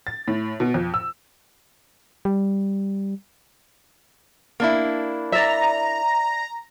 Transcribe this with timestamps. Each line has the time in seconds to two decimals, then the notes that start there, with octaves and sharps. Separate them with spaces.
0.07 A6
0.28 A2
0.60 B2
0.74 F2
0.94 E6
2.25 G3
4.60 A#3 D4 E4
5.32 D5 E5 A#5